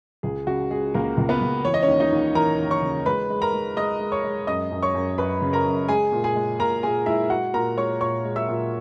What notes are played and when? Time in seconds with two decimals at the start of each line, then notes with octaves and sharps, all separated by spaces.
0.23 C#2 G#4
0.47 C#3 F#4
0.70 G#3 G#4
0.94 C#2 A#3 A#4
1.17 C#2
1.29 B3 B4
1.41 C#2
1.65 E3 C#5
1.74 D#5
1.82 C#4 C#5
1.88 D#2
2.00 D#4 D#5
2.12 D#2
2.35 E3 A#4 A#5
2.60 D#2
2.71 C#5 C#6
2.82 C#3
3.06 G#3 B4 B5
3.30 G#3
3.42 A#4 A#5
3.53 G#3
3.77 G#3 D#5 D#6
4.00 G#3
4.12 C#5 C#6
4.24 G#3
4.47 F#2 D#5 D#6
4.71 F#2
4.82 C#5 C#6
4.94 F#2
5.18 F#2 B4 B5
5.42 C#3
5.53 A#4 A#5
5.65 F#2
5.89 G#3 G#4 G#5
6.12 A#2
6.24 G#4 G#5
6.36 G#3
6.59 A#2 A#4 A#5
6.83 A#2 G#4 G#5
7.06 G#3 E4 E5
7.30 G#3 F#4 F#5
7.54 A#2 A#4 A#5
7.77 G#3 C#5 C#6
8.01 A#2 C#5 C#6
8.25 G#3
8.36 E5 E6
8.48 A#2